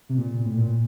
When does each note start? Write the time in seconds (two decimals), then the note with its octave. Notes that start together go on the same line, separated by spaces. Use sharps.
0.09 C3
0.18 A#2
0.31 A#2
0.45 A2
0.57 A#2